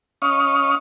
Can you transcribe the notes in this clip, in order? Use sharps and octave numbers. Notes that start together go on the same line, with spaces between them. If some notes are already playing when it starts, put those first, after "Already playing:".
C#4 D#5 F5 C#6